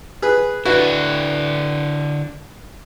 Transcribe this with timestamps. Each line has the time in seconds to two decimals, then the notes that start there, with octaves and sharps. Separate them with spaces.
0.22 G#4 B4
0.65 D3 D4 E4 F#4 B4